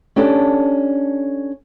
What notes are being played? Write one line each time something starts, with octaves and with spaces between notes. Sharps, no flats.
C#4 D4 G4 A4 G5